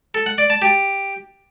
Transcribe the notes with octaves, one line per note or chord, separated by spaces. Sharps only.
A4
F#5
D5
A5
G4